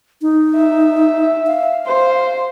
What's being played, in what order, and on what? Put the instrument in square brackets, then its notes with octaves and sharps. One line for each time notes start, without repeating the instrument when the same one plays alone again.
[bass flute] D#4
[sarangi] E5
[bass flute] F5
[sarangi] C5